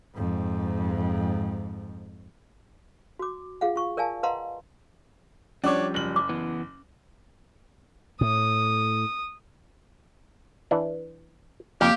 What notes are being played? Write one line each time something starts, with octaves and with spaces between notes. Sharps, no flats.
F2 G#2
F#4 D6
F4 G#4 F5 F#5
F4 C#6
A#4 D5 F5 G#5 A5
B4 D#5 F5 F#5 A#5 C6
F3 G3 C#4 D4 C#5 D6
F#1 F#7
D6
E3 B3
A2 D#6
E3 D4
F2 A#3 G4 G5